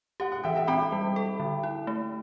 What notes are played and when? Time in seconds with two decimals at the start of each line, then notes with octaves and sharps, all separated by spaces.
0.20 G4 F#5
0.32 F#5
0.44 E3 E5 G5
0.55 E5 G5
0.67 C4 G5 B5
0.92 G3
1.16 A4
1.40 D3
1.63 E4
1.87 A3